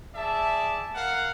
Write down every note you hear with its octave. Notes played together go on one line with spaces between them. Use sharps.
G#4 D5 E5 A5
A#4 F5 F#5